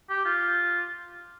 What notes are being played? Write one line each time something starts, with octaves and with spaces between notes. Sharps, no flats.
G4
F4